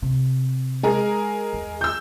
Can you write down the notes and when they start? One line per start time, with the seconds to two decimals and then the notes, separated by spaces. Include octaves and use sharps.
0.02 C3
0.83 G#3 G#4 A#4
1.53 E2
1.81 E6 G6